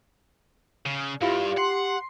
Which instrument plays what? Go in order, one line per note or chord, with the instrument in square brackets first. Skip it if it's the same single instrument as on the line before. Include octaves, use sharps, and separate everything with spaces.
[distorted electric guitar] C#3
[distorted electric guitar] G2 [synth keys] E4 F4 F5 [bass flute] G4
[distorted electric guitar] F#5 [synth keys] C6 C7